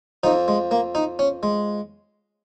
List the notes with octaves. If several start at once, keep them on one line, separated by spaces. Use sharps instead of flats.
F2 F3 D#4
G#3
A#3
D#4
C#4
G#3